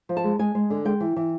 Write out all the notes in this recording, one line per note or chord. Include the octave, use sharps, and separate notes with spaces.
F3
A5
G#3
G#3 G#5
G#3
D3
G#3 G5
E3
E3